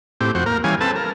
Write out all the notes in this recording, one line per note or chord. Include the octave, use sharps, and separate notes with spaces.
A2 C4 G4
F2 F#4 C5
A#3 A#4
E3 G3 C#4 F5 G#5
C4 A4 B4 A5
A#4